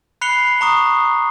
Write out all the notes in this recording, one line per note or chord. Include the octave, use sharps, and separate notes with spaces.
B5 F#6 C7 C#7 F7 G7
A#5 C#6 D#6